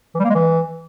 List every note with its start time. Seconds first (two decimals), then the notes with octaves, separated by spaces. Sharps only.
0.15 E3
0.20 G3
0.25 A#3
0.30 G#3
0.35 E3